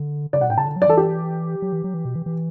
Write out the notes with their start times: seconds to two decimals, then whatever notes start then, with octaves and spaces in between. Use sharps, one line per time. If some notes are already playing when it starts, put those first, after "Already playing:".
Already playing: D3
0.33 C#3 D5
0.41 B2 F#5
0.50 A2 G5
0.58 C#3 A5
0.66 D3
0.76 F#3
0.82 D5
0.88 E3 A4
0.97 G4
1.62 F#3
1.72 E3
1.84 F#3
1.94 E3
2.05 B2
2.16 E3
2.26 E3